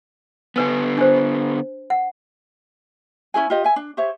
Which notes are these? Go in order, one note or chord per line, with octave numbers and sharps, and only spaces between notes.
D3 B3 D4 B4 G#5
D4 C5
F#5
C#4 E4 G#4 G#5
F4 G4 D#5
E5 G#5
D4
G4 C5 C#5 E5